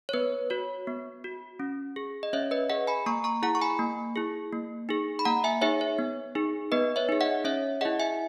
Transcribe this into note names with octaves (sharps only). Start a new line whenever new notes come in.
C#5
B3 B4
F#4 C#5
B3
F#4
C#4
G#4
D#5
C#4 C#5 E5
B4 D#5
G#4 D#5 F#5
G#5 B5
A#3 A#5 C#6
A#5 C#6
E4 G#4 F#5 A#5
C#6
G#5 B5
A#3
E4 G#4
A#3
D#4 G#4
B5
A#3 F#5 A#5
E5 G#5
D#4 G#4 C#5 E5
C#5
B3
D#4 G#4
B3 B4 D#5
C#5 E5
D#4 G#4
D#5 F#5
C#4 C#5 E5
E4 G#4 D#5 F#5
E5 G#5